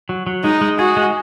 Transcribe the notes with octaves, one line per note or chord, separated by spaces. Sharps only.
F#3
F#3
G#3 D#4
G#3
F#4 G#4
G#3